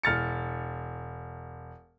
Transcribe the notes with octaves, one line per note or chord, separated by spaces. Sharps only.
E1 F6 A6 C#7